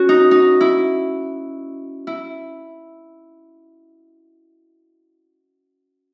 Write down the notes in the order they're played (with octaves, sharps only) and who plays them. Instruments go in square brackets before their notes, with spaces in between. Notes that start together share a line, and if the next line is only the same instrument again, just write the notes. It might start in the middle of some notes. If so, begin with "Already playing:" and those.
Already playing: [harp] C#4 F#4
D#4
D#4
E4
E4